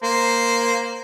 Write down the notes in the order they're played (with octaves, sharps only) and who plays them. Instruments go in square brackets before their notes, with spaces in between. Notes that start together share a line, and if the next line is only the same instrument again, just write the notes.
[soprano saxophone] A#3 [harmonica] C5